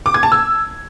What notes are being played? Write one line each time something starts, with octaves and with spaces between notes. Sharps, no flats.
D6
G#6
A5
E6